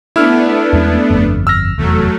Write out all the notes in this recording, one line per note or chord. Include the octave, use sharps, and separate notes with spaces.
A3 B3 D4 E4 E6 F6
E2 G#3 C#4
G1 F2
E6 F6 A#6
F1 E2 F#3 A3